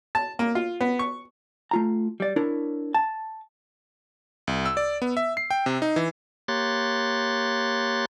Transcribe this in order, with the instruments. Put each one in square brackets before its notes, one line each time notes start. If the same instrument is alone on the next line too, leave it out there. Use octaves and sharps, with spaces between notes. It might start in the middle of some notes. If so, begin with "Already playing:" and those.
[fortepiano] A5
A#3
F4
B3
C#6
[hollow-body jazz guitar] A3 F4 A#5
G3 D5
D4 E4 A#4 C#5
A5
[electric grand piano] C2
E6
D5
B3
E5
C7
G5
C3
D#4
E3
[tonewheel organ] A#3 G4 C#5 C6 F#6 A6